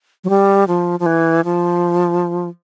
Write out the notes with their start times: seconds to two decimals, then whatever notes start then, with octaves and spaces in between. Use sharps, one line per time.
0.24 F#3
0.30 G3
0.68 F3
1.00 F3
1.06 E3
1.44 F3